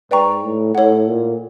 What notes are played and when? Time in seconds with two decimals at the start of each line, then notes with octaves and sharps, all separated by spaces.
0.11 G#2 B4 D5 G5 A#5 C#6
0.43 A2
0.75 A2 A4 C#5 F#5
1.07 A#2